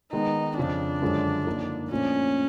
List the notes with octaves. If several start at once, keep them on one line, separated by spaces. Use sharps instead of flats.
D#3 G#3 B3 D#4
F2 C#3 F3 D4
F#2 D3 F3 G#3 C#4
D3 F3 A#3 D#4
A#2 F3 A3 C#4 D4